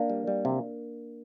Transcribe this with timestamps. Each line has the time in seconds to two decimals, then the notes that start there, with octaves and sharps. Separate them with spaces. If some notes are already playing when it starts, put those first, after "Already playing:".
Already playing: A#3 D4
0.10 G3
0.27 G3
0.45 C3